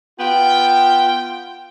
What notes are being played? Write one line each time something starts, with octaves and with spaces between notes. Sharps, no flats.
B3 F4 G5